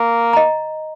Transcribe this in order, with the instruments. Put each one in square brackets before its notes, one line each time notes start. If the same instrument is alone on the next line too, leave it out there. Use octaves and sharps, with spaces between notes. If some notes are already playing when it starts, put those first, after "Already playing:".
Already playing: [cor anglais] A#3
[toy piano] D#5 A#5